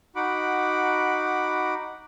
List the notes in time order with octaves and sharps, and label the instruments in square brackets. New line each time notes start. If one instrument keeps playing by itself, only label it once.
[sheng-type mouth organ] D#4 F#4 F#5 B5 D6